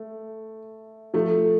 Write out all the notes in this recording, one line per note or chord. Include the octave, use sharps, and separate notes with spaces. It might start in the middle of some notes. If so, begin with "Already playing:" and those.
Already playing: A3
F3 A3